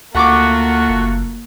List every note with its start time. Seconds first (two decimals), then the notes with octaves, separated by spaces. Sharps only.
0.15 D2 A3 A#3 F4 F#4 F#5 C#6 D6
0.90 F#1